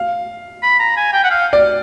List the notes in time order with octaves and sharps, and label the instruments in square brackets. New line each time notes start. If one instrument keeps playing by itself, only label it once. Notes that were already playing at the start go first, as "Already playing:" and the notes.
Already playing: [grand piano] F5
[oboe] B5
A#5
G#5
G5
F#5
F5
[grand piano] D5